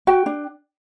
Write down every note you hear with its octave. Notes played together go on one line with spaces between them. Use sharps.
F#4 G5
D4